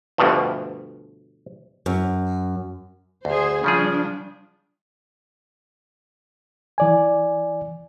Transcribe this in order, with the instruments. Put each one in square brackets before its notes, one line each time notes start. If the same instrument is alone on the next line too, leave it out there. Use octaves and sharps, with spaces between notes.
[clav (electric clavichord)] D2 G2 B2 F3
[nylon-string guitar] F#2
[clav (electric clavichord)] D2 [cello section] G#4 C5
[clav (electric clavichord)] C#3 F3 G#4 [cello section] G3 D4
[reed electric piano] E3 D5 G#5